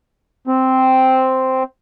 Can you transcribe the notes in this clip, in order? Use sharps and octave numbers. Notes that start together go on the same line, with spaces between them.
C4